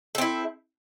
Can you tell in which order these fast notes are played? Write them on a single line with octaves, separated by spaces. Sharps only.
A4 C4 E4